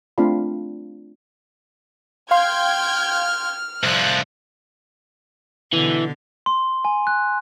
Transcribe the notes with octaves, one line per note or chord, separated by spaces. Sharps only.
A3 C4 D4 F4 F5 B5
F5 G5 C6 F6 G6 G#6
C2 F3 F#6
B2 D3 E3
C6
G#5
F#6